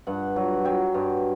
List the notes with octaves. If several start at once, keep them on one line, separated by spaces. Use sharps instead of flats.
G2 F#5
F#3
F#3 G5
G2